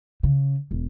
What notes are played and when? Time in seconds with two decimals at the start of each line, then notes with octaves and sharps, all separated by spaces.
0.23 C#3
0.71 E1